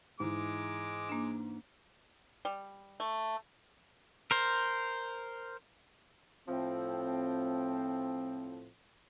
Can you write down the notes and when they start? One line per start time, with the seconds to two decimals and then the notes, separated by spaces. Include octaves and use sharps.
0.20 G#2 E3 G#3 D6
1.09 A#3 D4
2.45 G3
3.00 A3
4.31 A#4 C5
6.48 A2 F3 C4